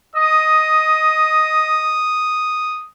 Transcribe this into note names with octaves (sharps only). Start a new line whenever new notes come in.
D#5 D#6